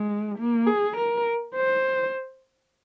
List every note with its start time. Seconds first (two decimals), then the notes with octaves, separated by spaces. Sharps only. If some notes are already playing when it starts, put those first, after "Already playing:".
Already playing: G#3
0.38 A#3
0.67 G#4
0.97 A#4
1.55 C5